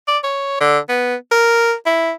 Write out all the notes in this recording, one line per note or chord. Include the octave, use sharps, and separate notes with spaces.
D5
C#5
D3
B3
A#4
E4